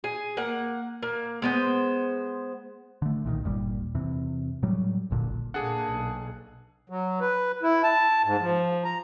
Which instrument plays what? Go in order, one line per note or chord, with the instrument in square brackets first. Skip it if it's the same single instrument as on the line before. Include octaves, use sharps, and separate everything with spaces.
[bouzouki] G#4
A#3 F#5
A#3
G#3 B3 C5
[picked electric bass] D3 A3
B1 A#2 D3 D#3
G1 D#2 A#2 G3
E2 C3
A2 F#3 G3
F1 A#1 A#2 D3
[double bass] A#2 A#3 [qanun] D4 A4 [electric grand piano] G#4 F#5
[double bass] B1
[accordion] F#3
B4
E4
A5
G#2
F3
A#5